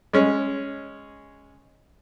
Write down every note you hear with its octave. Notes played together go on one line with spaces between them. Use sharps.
G#3 C#4